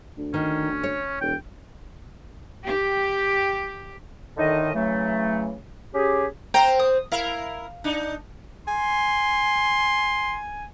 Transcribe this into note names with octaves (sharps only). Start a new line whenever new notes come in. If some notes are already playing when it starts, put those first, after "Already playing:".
D2
D#3 C#4
C#5
E1 G5
G4
A2 D3 D#3 D#4 D#5
C#3 E3 F#3 A3
C#4 G4 G#4
C4 A#4 C5 G5 A#5
D#6
E4 A#4 F5
D4 D#4
G#5 C6